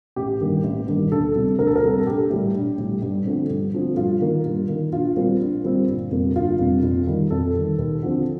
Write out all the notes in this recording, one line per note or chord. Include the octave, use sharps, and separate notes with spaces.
A1 G4
G2 D#3 A#3
A1
G2 D#3 A#3
D2 A4
C3 G3
D2 A#4
A4
A#4
C3 G3
A4
A#1 G4
A2 G3
A#1
A2 G3
G2
D3 F3 A3 C4
G2
D3 F3 A3 C4
G2 F4
D#3 A#3
G2
D#3 A#3
A#1 F4
A#2 G3 C4
A#1
A#2 G3 C4
G1
F2 C3 G3 A#3
G1 F4
F2 C3 G3 A#3
F2
D#3 G3
F2 A4
D#3 G3
D#2
D3 F3 C4